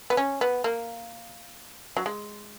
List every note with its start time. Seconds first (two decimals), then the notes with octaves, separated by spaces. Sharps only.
0.10 B3
0.17 C#4
0.41 B3
0.64 A#3
1.97 F#3
2.06 G#3